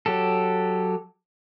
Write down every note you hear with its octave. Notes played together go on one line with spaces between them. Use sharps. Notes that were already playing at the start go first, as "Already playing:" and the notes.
F#3 G4 A4